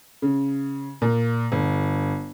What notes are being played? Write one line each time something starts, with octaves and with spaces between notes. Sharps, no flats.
C#3
A#2
G1